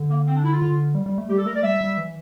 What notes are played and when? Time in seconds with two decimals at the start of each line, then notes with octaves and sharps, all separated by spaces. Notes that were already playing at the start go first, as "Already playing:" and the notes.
Already playing: D3
0.10 A#3
0.27 C4
0.36 D4
0.44 E4
0.53 F4
0.62 D3
0.95 G3
1.06 G3
1.18 A3
1.29 G3 G4
1.38 A4
1.46 A3 A#4
1.55 D5
1.63 G3 E5
1.81 G3
1.97 E3